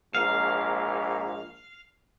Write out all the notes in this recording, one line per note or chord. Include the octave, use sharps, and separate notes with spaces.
A#1 G#2 A#3 F5